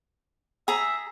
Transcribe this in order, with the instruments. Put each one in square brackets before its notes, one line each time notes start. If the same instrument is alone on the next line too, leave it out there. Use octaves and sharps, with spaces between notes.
[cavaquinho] G#4 A#5 [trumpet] E5